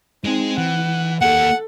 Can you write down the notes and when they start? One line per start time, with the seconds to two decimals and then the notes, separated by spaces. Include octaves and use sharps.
0.24 G#3 C4 D#4 G#4
0.58 E3 F#5
1.21 A#3 G4 A4 F#5